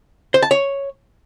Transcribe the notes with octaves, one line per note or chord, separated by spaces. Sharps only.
C5
A5
C#5